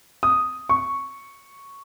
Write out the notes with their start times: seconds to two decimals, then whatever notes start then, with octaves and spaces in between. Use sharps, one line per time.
0.23 D#6
0.69 C#6